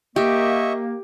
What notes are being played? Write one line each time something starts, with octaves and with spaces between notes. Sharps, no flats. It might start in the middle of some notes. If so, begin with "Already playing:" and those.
A#3 G4 D#5 E5 C#6